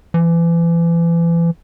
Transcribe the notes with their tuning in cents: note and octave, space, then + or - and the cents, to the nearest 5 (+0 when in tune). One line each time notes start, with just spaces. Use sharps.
E3 +35